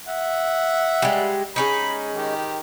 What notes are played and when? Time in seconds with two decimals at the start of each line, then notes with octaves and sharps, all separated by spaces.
0.07 E5 F#5
1.02 G3 G#3
1.56 G#3 C#4 D#4 B5
2.15 D#3 G4